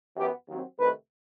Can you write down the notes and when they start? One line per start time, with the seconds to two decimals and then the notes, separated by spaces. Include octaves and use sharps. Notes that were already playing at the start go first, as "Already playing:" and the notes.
0.17 F#2 E3 B3 G4
0.47 D#2 D#3 F#3 C4
0.79 C2 C3 D#3 A3 B4